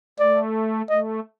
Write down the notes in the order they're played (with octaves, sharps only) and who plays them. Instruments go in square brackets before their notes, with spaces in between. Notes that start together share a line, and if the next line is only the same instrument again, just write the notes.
[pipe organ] A3 [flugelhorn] D5
[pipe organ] A3 [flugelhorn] D#5